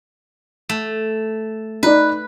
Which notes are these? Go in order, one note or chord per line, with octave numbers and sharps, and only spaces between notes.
A3
D#4 B4 D5